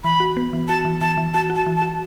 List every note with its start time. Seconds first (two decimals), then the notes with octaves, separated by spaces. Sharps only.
0.04 E3 B5
0.20 F#4
0.37 B3
0.53 E3
0.68 F#4 A5
0.85 E3
1.01 E3 A5
1.17 E3
1.34 F#4 A5
1.50 F#4
1.55 A5
1.66 E3
1.77 A5
1.82 F#4